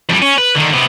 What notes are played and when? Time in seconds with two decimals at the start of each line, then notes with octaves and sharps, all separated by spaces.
0.09 F2 G3
0.22 C#4
0.38 B4
0.55 D3 D#3
0.73 C3 B3